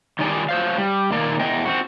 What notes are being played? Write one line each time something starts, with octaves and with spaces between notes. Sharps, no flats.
D#3 G3 D#4 D5 G#5
F#3 C5 F5
G3
A#2 D#3 A#3 D5
E2 D#5 G5
C4 F#4